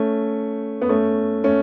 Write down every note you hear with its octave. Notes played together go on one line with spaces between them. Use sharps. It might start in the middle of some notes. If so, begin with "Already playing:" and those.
Already playing: A3 C#4
B3
A3 C#4
A3 C#4